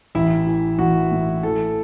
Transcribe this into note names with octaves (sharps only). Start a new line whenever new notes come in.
A1 E4 E5
E3
A1 F#4
A2
E3 A4